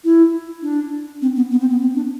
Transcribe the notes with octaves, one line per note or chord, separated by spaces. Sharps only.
E4
D4
C4
B3
B3
C4
B3
C4
D4